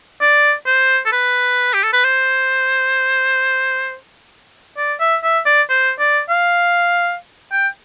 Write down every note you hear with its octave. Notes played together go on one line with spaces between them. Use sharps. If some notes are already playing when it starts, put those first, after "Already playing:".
D5
C5
A4
B4
G4
A4
B4
C5
D5
E5
E5
D5
C5
D5
F5
G5